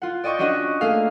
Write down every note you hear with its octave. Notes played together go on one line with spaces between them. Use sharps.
F4 F#5
D5 D#5 G5 C#6 G6
C#4 D4 F#4 D#5 F#5 C#6
A3 A#3 G#4 F5